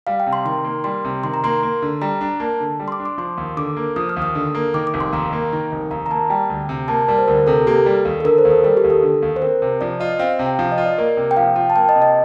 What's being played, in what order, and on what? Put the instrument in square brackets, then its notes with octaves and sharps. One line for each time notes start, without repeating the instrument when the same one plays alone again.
[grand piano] G3 [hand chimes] F5
[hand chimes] G5
[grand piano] C3
[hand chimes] C6
[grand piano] D#3 [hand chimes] C6
[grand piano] A#3
[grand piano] G3 [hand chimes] C6
[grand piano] C3
[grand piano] D#3 [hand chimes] C6
[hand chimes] A#5
[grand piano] A#3 [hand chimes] C6
[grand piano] A#3
D3
[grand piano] G3 [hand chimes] A#5
[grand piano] D4
[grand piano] A#3 [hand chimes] A5
[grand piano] D3
G3
[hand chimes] C6
D6
[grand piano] D4
[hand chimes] D6
[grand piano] F3 [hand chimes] C6
[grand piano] D#2
[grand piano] D3 [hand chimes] D6
[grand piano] A#3
[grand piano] F3 [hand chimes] D#6
[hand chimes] F6
[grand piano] D#2
[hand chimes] D#6
[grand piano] D3
A#3
[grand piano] D#3 [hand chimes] D6
[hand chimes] D6
[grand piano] F1
[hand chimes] C6
[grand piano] D#2 [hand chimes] A#5
[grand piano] A#3
D#3
F1
[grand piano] D#2 [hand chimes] A#5
[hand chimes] A#5
[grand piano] A#3 [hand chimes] A5
[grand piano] G3 [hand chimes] G5
[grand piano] D2
C3
[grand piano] A#3 [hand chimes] A5
[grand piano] G3 [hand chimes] A#4
[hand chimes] C5
[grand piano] D2 [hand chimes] A#4
[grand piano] C3 [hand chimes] A4
[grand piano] A#3 [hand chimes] G4
[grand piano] G3 [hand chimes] A4
[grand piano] D#2
[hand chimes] A4
[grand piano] D3 [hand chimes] A#4
[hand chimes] C5
[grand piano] D#2
[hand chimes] A4
[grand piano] G3 [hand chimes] A#4
[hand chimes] G4
[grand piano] D#2
[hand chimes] A4
[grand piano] D3
D#2
[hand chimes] C5
[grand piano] C4 [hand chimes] A#4
[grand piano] C3
[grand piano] F3 [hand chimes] D5
[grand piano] F4 [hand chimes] D#5
[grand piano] C4 [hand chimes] F5
[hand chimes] F5
[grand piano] C3
[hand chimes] G5
[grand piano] F3 [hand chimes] F5
[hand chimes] D#5
[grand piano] F4
[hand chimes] D5
[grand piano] A#3 [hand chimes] A#4
[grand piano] C3
[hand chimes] G5
[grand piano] F3 [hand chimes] F5
[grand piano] F4 [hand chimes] G5
[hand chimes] A5
[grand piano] A#3 [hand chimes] G5
[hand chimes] D#5
[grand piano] C3
[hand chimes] D#5